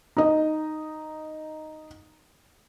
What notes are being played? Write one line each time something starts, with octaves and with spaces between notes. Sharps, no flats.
D#4 D#5